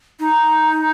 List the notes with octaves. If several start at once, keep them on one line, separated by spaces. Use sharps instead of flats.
D#4